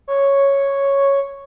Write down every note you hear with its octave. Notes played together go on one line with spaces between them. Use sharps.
C#5